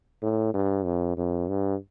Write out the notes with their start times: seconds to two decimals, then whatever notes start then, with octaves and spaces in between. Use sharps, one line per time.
0.22 A2
0.54 G2
0.85 F2
1.17 F2
1.48 G2